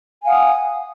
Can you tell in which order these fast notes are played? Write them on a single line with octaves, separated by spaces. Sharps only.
G#5 F5 F#5 D#6